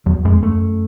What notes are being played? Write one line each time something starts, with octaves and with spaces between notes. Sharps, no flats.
E2 F#3
F#2 G#3
E2
F#2 A3